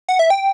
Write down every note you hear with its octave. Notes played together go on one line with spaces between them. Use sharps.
F#5
E5
G5